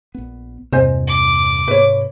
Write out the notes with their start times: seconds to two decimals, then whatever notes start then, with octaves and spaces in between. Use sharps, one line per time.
0.15 A#1 B3
0.73 E2 G2 C3 A#3 C5 D#5 G#5
1.07 D6
1.68 G#2 B4 C#5